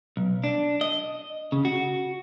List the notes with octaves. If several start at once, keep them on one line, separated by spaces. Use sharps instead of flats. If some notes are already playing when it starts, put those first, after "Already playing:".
B1
D4
D#5
C#3
F#4